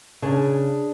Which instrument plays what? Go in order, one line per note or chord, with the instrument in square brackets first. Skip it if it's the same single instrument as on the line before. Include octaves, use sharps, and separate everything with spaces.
[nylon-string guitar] C#3 [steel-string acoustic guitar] D4 G#4 A5